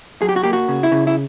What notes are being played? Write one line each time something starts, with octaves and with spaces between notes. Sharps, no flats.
F#3 G#4
G4
F#4
A#3 G4
F#4
C#3
E4
C#3
E4